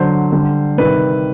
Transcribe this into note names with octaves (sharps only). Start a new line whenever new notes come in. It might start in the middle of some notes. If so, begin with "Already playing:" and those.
Already playing: D3 F#3 C5
D3 G3
C3 D#3 G3 B4